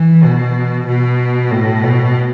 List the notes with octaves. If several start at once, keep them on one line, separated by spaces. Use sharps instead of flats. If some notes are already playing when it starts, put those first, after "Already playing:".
Already playing: E3
B2
B2
A2
B2